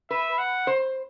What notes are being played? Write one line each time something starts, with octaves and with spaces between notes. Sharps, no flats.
B4 E5
F#5
C5